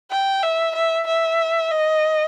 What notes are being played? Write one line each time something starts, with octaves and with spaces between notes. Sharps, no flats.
G5
E5
E5
E5
D#5